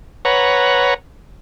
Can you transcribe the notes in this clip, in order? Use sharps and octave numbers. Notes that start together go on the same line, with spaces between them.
B4 C#5 F#5 A#5